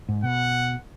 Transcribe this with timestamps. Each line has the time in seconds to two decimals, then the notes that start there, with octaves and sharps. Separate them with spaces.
0.09 G#2
0.23 B2 F#5